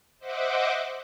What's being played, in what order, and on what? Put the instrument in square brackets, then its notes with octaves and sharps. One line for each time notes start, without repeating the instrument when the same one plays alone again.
[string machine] C5 D#5 E5 F#5 D6